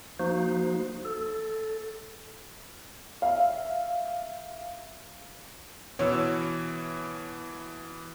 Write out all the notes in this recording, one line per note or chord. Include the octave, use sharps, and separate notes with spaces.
F3 A#3 D#4 F#4 C5
A4
E5 F5
B2 E3 C#5 E6